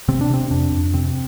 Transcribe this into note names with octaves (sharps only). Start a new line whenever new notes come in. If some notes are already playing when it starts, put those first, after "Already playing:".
C3 C4
D4
C3 C4
F2 D4
F2
C3 C4